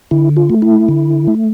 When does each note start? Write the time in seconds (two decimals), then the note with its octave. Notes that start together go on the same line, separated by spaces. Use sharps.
0.11 D3 E4
0.37 F4
0.50 A3
0.62 E4
0.89 D3
1.28 A3